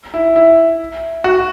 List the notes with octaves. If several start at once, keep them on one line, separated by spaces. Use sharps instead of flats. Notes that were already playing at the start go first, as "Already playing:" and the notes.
E4
E4
F#4